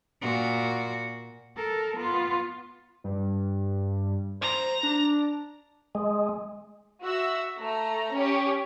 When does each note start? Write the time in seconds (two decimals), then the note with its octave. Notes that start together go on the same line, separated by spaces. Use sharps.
0.22 A#2 F#4
1.56 A4 A#4
1.97 B3 F4
3.04 G2
4.41 C5 A#5
4.83 D4
5.95 G#3
7.03 F#4 E5 E6
7.58 A3 A#5
8.13 C#4 G4